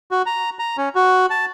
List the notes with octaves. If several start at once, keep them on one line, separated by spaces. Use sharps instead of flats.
F#4
A#5
A#5
C#4
F#4
A5